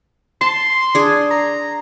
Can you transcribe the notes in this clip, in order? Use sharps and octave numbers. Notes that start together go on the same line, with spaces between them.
A5 C6
D4 G#4
A#5